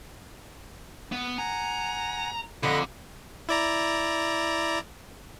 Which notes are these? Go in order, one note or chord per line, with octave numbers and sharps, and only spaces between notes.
B3
F#5 G#5 A#5
F2 D3 D#5 B5 F#6
E4 D5 A#5